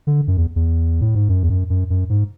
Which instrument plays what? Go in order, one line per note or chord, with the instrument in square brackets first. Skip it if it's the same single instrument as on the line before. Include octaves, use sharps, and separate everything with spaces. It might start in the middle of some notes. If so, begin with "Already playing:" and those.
[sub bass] D3
F#2
E2
E2
A2
G#2
F#2
E2
F#2
F#2
F#2
G#2